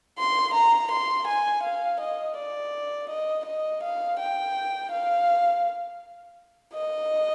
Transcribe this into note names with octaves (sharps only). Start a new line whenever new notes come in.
C6
A#5
C6
G#5
F5
D#5
D5
D#5
D#5
F5
G5
F5
D#5